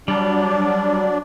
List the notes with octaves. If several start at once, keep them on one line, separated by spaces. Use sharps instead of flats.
F#3 G3 D4 D5